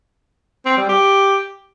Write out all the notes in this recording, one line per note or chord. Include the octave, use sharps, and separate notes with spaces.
C4
G3
G4